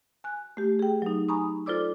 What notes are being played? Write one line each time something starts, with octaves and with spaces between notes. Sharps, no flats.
G#5 F#6
A3 G4
G#4 G5
F#3 D#4
G#5 A#5 B5 C#6 D#6
F4 A4 C5 D5 D6 E6